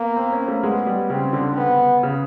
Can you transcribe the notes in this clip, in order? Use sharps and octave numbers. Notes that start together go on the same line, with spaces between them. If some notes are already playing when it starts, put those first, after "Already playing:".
Already playing: A#3 B3
C4
C#4
A3
G#3 B3
G3
C#3 C4
D3
B3
C#3